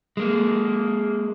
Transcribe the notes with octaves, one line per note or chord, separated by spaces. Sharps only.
G#3 A#3